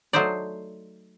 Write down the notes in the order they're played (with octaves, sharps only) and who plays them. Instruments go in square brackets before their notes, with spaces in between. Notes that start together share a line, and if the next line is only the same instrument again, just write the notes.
[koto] F#3 A3 D#4 C5 D5